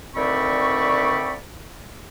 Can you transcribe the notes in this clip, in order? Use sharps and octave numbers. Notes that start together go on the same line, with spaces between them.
D2 D#3 C4 D5 B5 C#6